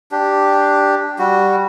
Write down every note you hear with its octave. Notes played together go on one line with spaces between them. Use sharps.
D4 G4
G3 F#4